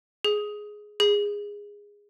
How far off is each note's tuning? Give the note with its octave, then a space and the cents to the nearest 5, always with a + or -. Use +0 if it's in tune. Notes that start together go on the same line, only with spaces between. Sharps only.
G#4 +10
G#4 -15